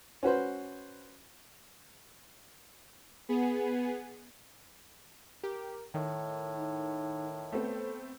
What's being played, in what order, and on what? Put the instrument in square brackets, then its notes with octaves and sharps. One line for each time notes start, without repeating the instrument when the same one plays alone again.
[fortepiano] C#4 F#4 B4 C5
[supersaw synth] B3 G#4
[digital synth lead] G4 [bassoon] A#4
[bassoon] A2 [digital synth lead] D#3
[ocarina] D#4
[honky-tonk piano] A3 B3 C4 [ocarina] A4